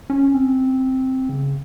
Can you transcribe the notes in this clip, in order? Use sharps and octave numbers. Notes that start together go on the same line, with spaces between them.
C#4
C4
C#3